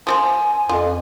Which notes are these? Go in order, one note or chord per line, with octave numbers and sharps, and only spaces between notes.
F3 A4 C5 G#5
F2 F4